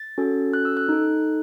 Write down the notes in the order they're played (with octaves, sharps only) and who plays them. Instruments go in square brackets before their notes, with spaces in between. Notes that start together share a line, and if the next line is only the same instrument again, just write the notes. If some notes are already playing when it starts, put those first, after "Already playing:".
Already playing: [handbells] A6
C#4 F#4 A4
F#6
E6
F#6
D#4 A4